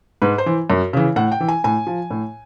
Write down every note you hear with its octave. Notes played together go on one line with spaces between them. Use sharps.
G#2 B4
C5
E3
F#2
C#3 E3
A2 F#5
G5
E3
G#5
A2 G#5
F3
A2